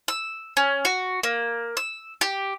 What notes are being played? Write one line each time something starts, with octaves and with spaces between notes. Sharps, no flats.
E6
C#4
F#4
A#3
E6
G4